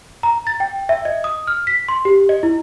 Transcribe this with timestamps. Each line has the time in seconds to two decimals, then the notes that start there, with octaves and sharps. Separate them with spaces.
0.23 A#5
0.47 A6
0.60 G5
0.89 E5
1.05 D#5
1.24 D#6
1.47 F6
1.67 B6
1.88 C6
2.05 G4
2.29 D#5
2.43 E4